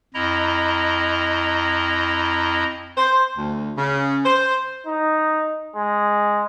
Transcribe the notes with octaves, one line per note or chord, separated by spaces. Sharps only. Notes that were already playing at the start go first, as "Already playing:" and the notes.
F2 E4 D#5 A#5
C5
D2
C#3
C5
D#4
G#3